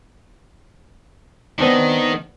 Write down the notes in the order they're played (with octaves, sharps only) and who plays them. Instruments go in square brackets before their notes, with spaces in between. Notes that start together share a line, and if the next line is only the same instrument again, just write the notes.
[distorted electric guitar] D#3 [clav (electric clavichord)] B3 C4 D4